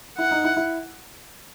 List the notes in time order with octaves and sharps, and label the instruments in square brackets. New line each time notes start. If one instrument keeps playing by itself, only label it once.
[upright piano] E4 [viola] F#5
[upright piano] D#4
E4
E4